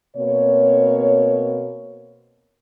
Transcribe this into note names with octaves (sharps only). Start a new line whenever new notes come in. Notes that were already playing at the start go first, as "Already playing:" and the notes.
B2 A#3 C4 C#5